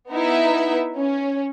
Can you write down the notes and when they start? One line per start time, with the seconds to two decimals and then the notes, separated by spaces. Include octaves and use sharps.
0.11 B3 D#4 E4 E5
0.97 C#4